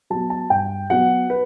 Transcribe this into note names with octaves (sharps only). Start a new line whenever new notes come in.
F#3 B3 A5
A5
G2 G5
F#3 B3 F#5
B4